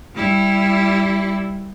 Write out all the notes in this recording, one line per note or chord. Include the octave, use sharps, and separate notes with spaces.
G3 E4